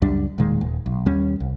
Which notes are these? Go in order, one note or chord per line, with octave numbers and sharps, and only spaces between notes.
C#2 F#2 G3 D4
E1 A#2 D#3 G#3
D#1
B1
D#2 G3 C#4
C2